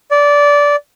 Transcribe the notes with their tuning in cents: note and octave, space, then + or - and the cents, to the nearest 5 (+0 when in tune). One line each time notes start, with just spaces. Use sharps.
D5 -15